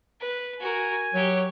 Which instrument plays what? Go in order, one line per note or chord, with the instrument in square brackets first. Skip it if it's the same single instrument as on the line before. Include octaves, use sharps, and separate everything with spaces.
[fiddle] B4
[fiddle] F#4 A#4 [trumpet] G#5
[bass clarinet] F#3 [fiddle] G4 C#5